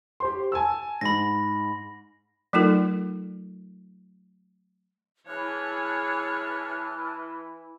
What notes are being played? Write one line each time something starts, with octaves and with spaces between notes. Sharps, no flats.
G4 C5 C6
G#5 A5 E6
G#2 B5 A#6
F#3 A3 D#4 F4 A4 A#4
E3 E4 G#4 C#5 A5 F6 F#6